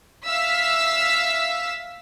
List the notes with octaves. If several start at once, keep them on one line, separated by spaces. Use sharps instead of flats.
E5 F5 E6 B6